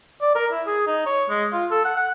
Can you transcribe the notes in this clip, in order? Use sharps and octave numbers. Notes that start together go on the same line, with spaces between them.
D5
A#4
E4
G#4
D#4
C#5
G#3
F4
A4
F#5
F#5